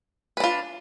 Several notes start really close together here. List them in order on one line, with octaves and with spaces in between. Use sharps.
B4 D4 F4